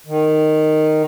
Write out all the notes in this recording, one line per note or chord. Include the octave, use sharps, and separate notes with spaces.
D#3